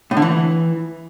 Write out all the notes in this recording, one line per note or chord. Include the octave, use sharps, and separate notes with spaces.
A2
D3
E3